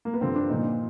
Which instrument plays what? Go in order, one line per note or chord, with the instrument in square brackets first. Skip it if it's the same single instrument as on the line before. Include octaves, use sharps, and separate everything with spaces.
[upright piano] A#3
B3
G2 D3 F3 C4
D4
A#2 F3 D#4